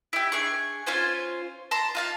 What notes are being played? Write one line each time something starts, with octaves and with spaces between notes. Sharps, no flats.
E4 G4
D4 G#4 C#6
C#4 F4 C5 G#5
A5 A#5 C6
F4 F5 A5